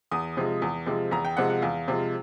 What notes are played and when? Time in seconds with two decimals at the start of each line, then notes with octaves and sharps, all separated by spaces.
0.11 E2 D#6
0.37 C3 F3 G#3
0.62 E2
0.86 C3 F3 G#3
1.11 E2 A#5
1.25 G5
1.37 C3 F3 G#3 F#5
1.50 F#5
1.62 E2 F5
1.88 C3 F3 G#3